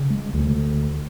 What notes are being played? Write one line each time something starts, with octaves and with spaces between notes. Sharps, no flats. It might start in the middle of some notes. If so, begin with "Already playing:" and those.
Already playing: C#3
G#3
D2